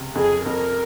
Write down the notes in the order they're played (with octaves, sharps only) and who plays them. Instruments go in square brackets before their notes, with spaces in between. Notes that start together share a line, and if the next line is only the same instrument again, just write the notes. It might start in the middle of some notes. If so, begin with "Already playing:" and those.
Already playing: [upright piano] C#2 C3
[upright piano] F2 [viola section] G#4
[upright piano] F2 [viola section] A#4